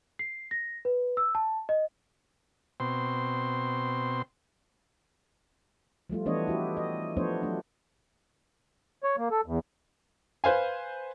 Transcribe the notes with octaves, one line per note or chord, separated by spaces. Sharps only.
C7
A#6
B4
E6
A5
D#5
B2 C4 C6
F3 G3 A3 F4
E3 A3 B3 D4 C#5 D#5
E4 F#4 G4
D#5
F3 A3 B3 D4 C5 C#5
F#3 A3 D4
C#5
A#3
A4
E2
B4 C5 F5 G#5